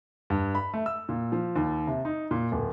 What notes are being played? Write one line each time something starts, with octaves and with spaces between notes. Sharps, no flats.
G2
B5
A3
E6
A#2
F3
D#2
C3
D#4
A#2
D1